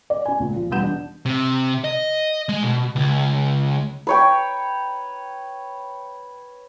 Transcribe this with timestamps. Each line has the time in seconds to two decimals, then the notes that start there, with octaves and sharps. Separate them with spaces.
0.10 D5
0.25 C#4 G#5
0.40 C#2 A#2
0.56 F3
0.70 E1 G3 B3 F#5 G6 E7
0.83 D4
1.26 C3
1.84 D#5
2.49 G#3
2.63 B2
2.96 C#2
4.07 B4 C#5 G5